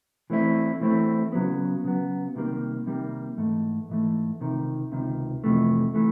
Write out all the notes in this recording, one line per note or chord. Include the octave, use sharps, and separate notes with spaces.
E3 A3 C4 E4
E3 A3 C4 E4
C#3 F#3 B3
C#3 F#3 B3
C2 C3 D#3 G3 A#3
C2 C3 D#3 G3 A#3
G#2 E3 A3
G#2 E3 A3
C#2 C3 D#3
C#2 C3 D#3
F2 C3 E3 A3
E3 A3